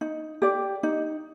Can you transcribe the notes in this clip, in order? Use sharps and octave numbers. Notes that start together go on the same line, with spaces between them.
D#4
G4 D5
D#4